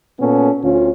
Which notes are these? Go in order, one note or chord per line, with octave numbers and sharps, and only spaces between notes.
A#2 B3 C#4 A4
D2 C#4 F4